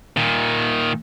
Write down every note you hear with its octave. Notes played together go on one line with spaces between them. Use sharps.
A#2 D#3